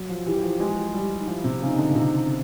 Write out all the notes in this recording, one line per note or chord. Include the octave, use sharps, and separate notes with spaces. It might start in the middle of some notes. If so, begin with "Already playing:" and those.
Already playing: F#3
F3
E3 G4
E3
F3
G#3
G3
D#4
F3 E4
C3
C#3 D#4
D3
C#3
C3